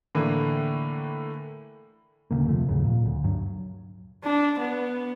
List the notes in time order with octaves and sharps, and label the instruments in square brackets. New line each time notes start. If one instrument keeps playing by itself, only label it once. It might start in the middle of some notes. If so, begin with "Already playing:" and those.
[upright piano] A2 D3 E3 A3 A#3
[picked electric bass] D1 D2 C#3 A#3
F2 C3 F3 A3
D#2 G#2 C#3 F#3
A#2
D2
G2 F#3
[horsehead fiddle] D4
B3